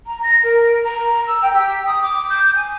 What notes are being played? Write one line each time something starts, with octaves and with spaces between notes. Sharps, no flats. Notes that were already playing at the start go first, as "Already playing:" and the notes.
A#5
A#6
A#4
A#5
E6
G5
G4
D#6
D6
G6
G#5